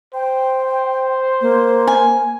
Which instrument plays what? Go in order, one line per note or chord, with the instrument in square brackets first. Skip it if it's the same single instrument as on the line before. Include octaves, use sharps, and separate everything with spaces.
[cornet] C5 [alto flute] G5
[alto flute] A#3
[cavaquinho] G#5